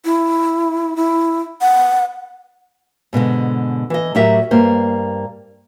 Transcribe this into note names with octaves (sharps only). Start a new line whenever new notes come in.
E4
E4
F#5
G#2 B2 D3 G#3
E3 D#5
A2 F#3 F#4 G4 A#4 E5
G2 A#3 C5